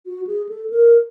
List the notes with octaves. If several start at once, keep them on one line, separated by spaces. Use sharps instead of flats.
F#4
G#4
A4
A#4